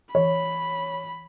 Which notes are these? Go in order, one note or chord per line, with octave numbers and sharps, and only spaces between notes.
E3 C#5 B5